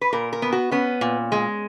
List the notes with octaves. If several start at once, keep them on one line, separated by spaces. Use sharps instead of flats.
B4
A#2 A#4
A#4
B3
F#4
B3 C#4
A#2
G#3